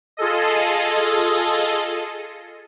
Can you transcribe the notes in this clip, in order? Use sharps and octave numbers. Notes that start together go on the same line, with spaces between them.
F4 G#4 A4 D#5